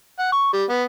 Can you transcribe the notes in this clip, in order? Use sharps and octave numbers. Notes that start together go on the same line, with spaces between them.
F#5
C#6
G3
B3